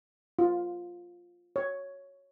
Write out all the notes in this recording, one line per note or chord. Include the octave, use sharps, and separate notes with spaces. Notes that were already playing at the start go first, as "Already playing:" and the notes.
F4
C#5